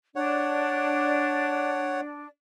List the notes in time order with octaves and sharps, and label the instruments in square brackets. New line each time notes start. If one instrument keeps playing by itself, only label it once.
[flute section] D4 D5 [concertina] C#5 F#5